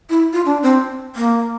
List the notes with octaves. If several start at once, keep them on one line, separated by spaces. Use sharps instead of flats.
E4
F4
D4
C4
A#3